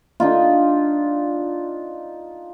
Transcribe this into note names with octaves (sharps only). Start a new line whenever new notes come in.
D4 D#4 F4